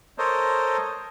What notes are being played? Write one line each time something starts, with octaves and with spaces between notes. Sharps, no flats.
A4 A#4 C5 C#5 D#5